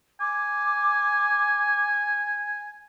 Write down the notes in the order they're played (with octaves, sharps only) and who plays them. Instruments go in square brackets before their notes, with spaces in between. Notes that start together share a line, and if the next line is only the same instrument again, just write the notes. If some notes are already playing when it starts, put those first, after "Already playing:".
[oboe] G#5 [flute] D6